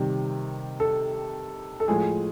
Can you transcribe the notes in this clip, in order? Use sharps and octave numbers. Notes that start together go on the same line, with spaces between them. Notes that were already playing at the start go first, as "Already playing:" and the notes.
Already playing: C3 D#3 G3
A4
A4
A2 F3 G#3 G#4